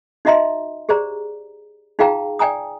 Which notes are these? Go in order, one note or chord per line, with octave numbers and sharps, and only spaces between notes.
D#4 F#4 D#5 E5 A#5 C6
G4 G#4 C5 D5 A#5
D#4 F4 G#4 F5 G5 A#5
D5 G5 G#5 A#5 D#6